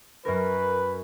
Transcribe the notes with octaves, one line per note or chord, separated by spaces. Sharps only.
F#2 C#4 A#4 B4